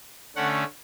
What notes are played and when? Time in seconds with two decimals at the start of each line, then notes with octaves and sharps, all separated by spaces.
0.36 D3 A3 C#4 F#5